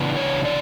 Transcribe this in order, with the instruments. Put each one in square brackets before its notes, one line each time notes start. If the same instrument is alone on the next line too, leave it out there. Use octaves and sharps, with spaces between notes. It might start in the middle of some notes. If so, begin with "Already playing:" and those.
Already playing: [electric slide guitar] C#3 E3 B3 D4
C#5
D5